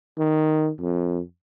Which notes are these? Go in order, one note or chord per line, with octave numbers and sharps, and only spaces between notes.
D#3
F2